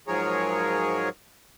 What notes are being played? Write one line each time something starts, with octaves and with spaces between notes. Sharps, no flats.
G#2 F3 F#3 G#4 A#4 C#5